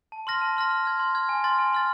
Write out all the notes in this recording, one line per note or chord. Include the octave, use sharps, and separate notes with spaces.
A5
C6 F6 A#6
A5
C6 F6 A#6
C6
F6 G#6
C6
F6 G#6
G#5
C6 F6 A6
G#5
C6 F6 A6